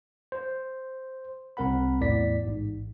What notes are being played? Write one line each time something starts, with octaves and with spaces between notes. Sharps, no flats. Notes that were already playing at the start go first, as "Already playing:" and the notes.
C5
C2 C4 A#4 F#5 B5
E2 A2 D5 B6
A1 G#2